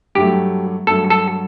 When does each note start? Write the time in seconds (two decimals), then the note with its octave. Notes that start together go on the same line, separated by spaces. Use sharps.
0.15 G2 F#3 A3 G4
0.87 G2 F#3 A3 A4
1.10 A4